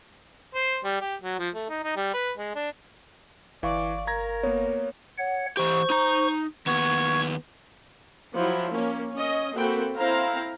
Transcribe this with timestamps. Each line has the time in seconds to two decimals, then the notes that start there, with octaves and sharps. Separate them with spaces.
0.55 C5
0.84 G3
1.01 G4
1.22 F#3
1.39 F3
1.55 A3
1.70 D#4
1.84 D#4
1.96 G3
2.14 B4
2.38 G#3
2.56 D4
3.63 G1 E3 D5 F5 C#6
4.07 A#4 A#5 G#6 A#6
4.43 A#3 B3 C#5
5.18 C#5 F#5
5.57 E3 G4 C5 C#6
5.90 D#4 A#5
6.66 D#2 B3 C#6 G#6
8.35 F3 F#3 E4
8.73 A#3 C#4
9.14 C#4 D#5
9.54 A#3 C4 F#4 A4 G5 B5
9.97 C4 E4 C5 F5 A#5